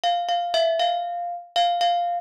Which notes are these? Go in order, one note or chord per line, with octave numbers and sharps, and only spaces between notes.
F5
F5
E5
F5
F5
F5